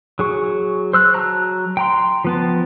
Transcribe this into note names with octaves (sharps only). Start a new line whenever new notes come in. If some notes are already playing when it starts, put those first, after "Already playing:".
F#3 G#4 C#6
C5 E6 F#6
F#3 A5 A#5 F#6
G5 A#5 C6
F3 B3 A5